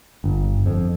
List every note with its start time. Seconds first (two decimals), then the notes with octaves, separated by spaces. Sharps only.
0.24 G1
0.66 F2